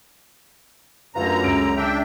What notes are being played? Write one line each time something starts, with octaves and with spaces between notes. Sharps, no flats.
F#2 D3 A3 F4 B4 A#5
C#2 C#3 D7
D4 E5 G5